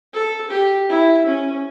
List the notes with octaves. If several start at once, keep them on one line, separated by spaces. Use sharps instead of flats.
A4
G4
E4
C#4